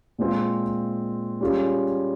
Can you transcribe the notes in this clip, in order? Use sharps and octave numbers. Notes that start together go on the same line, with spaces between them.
A#2 G#3 C4 F4
G3 C#4 F4 G#4